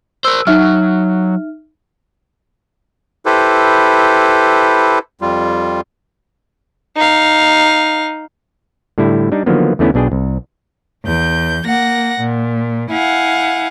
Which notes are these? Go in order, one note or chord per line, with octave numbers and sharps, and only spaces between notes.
A#4 C5 E6
F#3 D#4 E5 F6
E4 G4 A4 B4 C5
F2 G3 F4
D#4 F5
A2 D3 G3 E4
G3 D4 D#4
D3 D#3 F3 F#3 A#3 B3
E2 D3 A3 B3 C#4 E4
B1 B2 D4 G#4 G5
C2
E2 G6
A#3 F#5 A#6
A#2
E4 F5 F#5 G#5